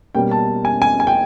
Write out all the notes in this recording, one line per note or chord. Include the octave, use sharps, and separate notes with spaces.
B2 G3 A#3 C#4 G5
A5
G#5
G#5
G#5
G5